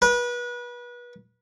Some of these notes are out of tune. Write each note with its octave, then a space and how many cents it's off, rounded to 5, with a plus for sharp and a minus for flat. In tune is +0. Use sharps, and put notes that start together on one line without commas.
B4 -30